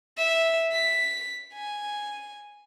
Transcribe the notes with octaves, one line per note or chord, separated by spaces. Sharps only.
E5
B6
G#5